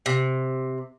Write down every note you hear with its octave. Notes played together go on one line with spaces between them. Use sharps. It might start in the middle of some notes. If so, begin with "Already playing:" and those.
C3